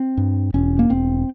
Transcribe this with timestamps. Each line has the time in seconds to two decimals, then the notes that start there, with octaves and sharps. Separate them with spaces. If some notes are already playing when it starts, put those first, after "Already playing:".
Already playing: C4
0.17 G2
0.54 E1 C#4
0.79 A#3
0.90 E1 C4